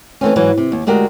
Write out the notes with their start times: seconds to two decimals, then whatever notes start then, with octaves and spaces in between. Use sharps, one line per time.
0.21 E3 A3 C4 C#4
0.36 G#2 E3 F#3
0.58 C3
0.72 D#2
0.87 D2 G#3 F#4 G4 A#4